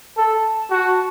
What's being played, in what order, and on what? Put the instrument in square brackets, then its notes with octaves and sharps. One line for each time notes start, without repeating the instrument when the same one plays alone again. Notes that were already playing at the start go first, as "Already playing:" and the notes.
[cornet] A4 [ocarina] A5
[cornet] F#4